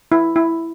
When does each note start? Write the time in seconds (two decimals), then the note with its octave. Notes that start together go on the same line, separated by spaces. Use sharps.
0.12 E4
0.36 E4